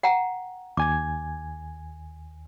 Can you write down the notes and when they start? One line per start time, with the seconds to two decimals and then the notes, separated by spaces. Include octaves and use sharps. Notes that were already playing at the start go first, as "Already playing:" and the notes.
0.03 F#5 G5 A#5
0.77 D#2 G#5 D6 G#6